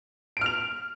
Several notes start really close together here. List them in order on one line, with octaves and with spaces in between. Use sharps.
D7 F6 F7